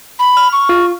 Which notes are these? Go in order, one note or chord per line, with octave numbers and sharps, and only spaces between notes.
B5
F6
C#6
F4